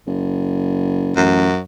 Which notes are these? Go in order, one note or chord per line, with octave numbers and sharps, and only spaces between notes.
F#1
A1 F#2